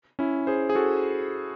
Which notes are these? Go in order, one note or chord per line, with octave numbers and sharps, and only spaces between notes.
C#4 E4
G#4 C5
G#4
F#4 A4